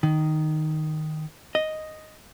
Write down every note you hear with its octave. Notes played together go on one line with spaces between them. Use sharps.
D#3
D#5